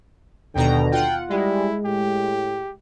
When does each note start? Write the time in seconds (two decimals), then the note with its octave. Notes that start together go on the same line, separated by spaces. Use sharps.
0.55 D#2 B2 D3 G5 A#5
0.92 F4 F#5 G5
1.30 G3 G#3 E4
1.85 A2 G4